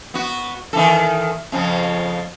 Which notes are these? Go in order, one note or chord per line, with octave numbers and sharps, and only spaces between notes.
B3 F#4
D#3 E3 A4
F2 C#3 F3